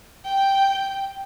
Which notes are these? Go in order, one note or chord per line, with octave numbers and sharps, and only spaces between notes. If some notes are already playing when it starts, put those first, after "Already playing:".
G5